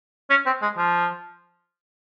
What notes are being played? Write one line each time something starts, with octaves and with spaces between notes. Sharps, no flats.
C#4
C4
G#3
F3